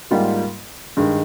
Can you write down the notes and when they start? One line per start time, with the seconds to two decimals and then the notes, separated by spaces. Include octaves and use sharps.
0.11 G#2 G3 A#3 F4
0.97 G2 D#3 G#3